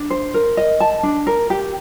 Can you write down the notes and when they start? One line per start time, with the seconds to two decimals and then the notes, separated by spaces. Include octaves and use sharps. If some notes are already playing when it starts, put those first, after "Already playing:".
Already playing: D4
0.10 C5
0.34 A#4
0.57 D#5
0.80 A5
1.03 D4
1.27 A#4
1.50 G4